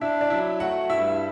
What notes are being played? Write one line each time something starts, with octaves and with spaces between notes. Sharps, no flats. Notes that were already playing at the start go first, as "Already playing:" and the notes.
D4 E4 E5
D5
F#3 E4 E5
A3 F#4 F#5
G2 E4 E5